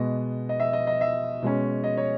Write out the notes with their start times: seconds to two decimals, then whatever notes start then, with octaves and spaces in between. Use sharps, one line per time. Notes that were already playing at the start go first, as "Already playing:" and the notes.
Already playing: B2 G#3 B3 D#5
0.49 D#5
0.60 E5
0.73 D#5
0.87 D#5
1.01 E5
1.42 B2 G#3 C#4
1.84 D#5
1.97 C#5